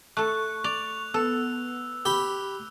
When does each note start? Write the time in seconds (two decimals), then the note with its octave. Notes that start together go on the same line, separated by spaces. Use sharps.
0.17 A3 A4 C#6 F#6
0.64 D5 F7
1.14 B3 A4 E6
2.05 G4 B5